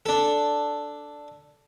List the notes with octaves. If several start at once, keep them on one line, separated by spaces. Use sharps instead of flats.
D4 A4